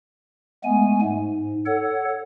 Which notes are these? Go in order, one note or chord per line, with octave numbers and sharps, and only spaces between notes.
G#3 A3 B3 G#5
G#2
A4 C#5 F#5